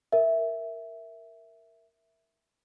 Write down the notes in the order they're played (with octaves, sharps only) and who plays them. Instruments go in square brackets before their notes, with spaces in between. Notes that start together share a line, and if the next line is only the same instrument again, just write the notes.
[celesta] A#4 E5